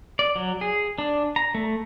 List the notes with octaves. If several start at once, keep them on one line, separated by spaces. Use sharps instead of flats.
D5
F#3
G#4
D4
A#5
A3